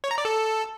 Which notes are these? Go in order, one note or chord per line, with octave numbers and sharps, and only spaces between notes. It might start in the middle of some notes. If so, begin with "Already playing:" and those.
C#5
A#5
D5
A4